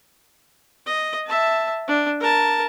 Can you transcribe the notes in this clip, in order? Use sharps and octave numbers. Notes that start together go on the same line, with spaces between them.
D#5
E5 A5
D4
A#4 A5